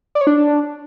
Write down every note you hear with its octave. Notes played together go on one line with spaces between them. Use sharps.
D5
C#5
D4